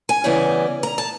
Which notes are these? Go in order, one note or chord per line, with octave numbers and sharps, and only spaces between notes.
G#5
C#3 E3 G3 B3
A#5
A5